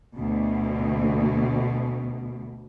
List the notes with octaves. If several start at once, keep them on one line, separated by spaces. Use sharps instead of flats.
D2 B2